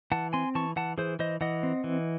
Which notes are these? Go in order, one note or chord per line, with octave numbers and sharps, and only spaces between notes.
E3 F#5 A5
C4 G#5 C6
E3 A5 C#6
E3 F#5 A5
E3 G#4 C5
E3 C5 D#5
E3 D#5 F#5
C4
E3